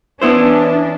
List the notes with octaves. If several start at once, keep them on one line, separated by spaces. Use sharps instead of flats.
E3 B3 C#4 D4 E4 C5